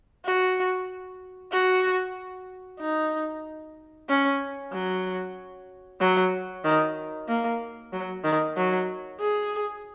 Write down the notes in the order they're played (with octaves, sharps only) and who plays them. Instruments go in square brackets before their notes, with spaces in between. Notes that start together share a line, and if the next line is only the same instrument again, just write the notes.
[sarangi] F#4
F#4
D#4
C#4
F#3
F#3
D#3
A#3
F#3
D#3
F#3
G#4